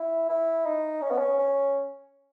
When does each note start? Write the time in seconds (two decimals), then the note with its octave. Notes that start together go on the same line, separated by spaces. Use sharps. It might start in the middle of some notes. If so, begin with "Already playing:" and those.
Already playing: E4
0.29 E4
0.66 D#4
1.02 C#4
1.11 B3
1.19 C#4
1.39 C#4